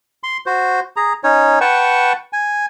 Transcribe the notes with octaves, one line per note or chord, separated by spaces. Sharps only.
C6
F#4 C5
G#4 A#5
C#4 D#4 C#5
B4 F#5 G5 A5 C#6
G#5